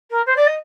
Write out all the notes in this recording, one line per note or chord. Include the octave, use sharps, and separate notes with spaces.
A#4
C5
D5
D#5